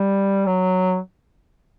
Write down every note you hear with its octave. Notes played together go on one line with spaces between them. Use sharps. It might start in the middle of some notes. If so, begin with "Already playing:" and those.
Already playing: G3
F#3